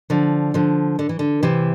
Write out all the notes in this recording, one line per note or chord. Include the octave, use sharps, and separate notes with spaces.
D3 F3
D3 F3
D3
E3
D3
C3 E3